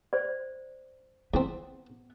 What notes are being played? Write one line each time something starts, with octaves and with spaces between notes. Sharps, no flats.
C5 D5
E2 B3 C4